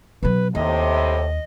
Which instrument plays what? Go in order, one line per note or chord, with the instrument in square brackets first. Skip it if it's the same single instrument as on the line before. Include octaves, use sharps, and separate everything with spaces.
[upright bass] B2 F#3 [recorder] B4
[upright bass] D#2 [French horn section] A2 C3 [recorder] D#5